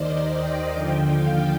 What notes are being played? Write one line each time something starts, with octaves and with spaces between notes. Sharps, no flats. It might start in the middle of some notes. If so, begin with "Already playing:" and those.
Already playing: D#2 D#3 C5 D5 D#5
G5
D#2 D3 F3 G5
F5